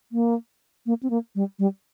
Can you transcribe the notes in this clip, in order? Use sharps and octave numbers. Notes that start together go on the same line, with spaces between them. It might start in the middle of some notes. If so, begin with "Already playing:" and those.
A#3
A#3
C4
A#3
G3
G3